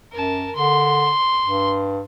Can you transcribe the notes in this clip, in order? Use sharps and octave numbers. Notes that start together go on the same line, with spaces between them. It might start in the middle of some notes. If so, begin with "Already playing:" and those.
F#2 A#4 A5
D3 C6
G2